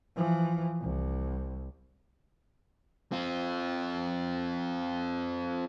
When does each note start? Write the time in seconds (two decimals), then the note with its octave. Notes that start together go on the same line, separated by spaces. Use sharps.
0.16 E3 F3
0.80 C2
3.12 C4 F4